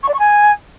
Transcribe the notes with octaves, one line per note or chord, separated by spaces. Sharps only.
C#6
D5
C#6
G#5